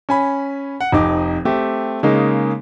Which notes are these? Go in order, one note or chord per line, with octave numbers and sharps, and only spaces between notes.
C#4 G#5 B5
F#5
F1 F2 D#4 D6
A3 C4 G4
C#3 G#3 A#3 D#4